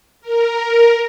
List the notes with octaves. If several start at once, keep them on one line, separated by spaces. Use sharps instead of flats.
A#4